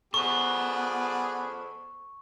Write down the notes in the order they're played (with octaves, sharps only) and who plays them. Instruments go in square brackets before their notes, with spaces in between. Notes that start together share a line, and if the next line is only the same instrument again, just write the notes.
[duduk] B3 [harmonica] G#4 D5 B5 [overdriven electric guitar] A4 C5 [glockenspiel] C#6